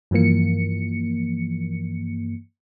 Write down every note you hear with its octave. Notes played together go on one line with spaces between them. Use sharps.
G2 E3 F3 A#3 C#7